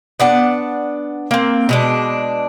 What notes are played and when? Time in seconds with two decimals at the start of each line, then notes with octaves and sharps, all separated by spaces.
0.20 B3 D4 F#5
1.31 A#3 C4
1.69 B2 G#3 D4